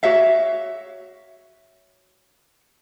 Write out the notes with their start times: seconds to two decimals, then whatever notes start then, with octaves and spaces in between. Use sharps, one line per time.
0.03 F#4 C#5 E5 F5